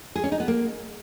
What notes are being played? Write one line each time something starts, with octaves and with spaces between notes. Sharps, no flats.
G#4
C#4
D#4
B3
A#3